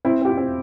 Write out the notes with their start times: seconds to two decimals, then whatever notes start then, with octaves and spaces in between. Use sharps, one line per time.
0.05 C4 E4
0.22 C4 G4
0.29 F4
0.37 C4